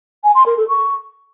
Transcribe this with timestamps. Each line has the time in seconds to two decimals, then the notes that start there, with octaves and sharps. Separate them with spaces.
0.24 G#5
0.35 C6
0.46 A#4
0.57 A4
0.68 C#6